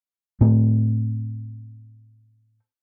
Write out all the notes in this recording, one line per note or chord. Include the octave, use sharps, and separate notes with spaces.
A2 A3 C4